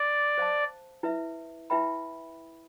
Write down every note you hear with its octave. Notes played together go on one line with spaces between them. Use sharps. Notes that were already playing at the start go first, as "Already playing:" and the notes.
Already playing: D5
C5 F5 A5
E4 B4 E5
E4 B4 E5 G5 B5